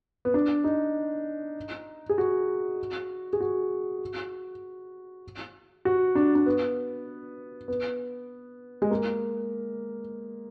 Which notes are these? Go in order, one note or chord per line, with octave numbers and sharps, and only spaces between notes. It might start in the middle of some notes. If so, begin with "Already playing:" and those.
B3
D4
D#4
G#4
F#4
G#4
F#4
F#4
D4
D4
B3
B3
G#3
A#3